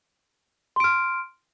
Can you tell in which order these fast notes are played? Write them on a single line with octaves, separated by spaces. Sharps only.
C6 D7 F6